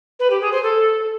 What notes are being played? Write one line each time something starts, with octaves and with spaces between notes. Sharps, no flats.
B4
G4
G#4
C5
A4